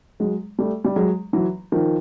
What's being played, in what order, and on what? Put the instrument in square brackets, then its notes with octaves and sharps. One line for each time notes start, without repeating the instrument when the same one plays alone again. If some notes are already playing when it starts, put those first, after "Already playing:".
[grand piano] F#3 G#3
G3 A3
G3
F#3 G#3
E3 F#3
D#3 F3